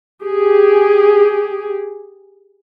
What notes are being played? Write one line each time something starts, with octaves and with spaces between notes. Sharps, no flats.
G4 G#4